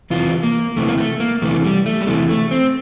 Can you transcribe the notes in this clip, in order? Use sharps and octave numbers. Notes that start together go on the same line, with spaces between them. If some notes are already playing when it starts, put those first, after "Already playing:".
E2 C3 E3 F4
A#3
E2 C3 E3 A3
A#3
A3
A#3
E2 C3 E3 A3
G3
A3
G3
E2 C3 E3 A3
A3
C4